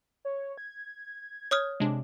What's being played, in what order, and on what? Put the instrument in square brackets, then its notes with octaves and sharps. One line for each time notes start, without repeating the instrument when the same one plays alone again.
[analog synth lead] C#5
G#6
[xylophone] C#5 D#6 F6
[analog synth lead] C3 [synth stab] G#3 D4